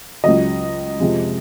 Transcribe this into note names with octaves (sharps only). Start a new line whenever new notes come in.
C#2 C#3 F#3 D#5
F2 C3 F3 G#3